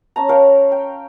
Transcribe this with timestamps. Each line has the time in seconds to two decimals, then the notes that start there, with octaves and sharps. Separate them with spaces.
0.16 C#4 A5 A#5
0.29 A#4 C#5 F5 G5
0.72 G5